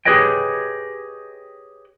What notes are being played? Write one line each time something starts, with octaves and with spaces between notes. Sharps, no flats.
G4 G#4 B4 C#5 D#5 G5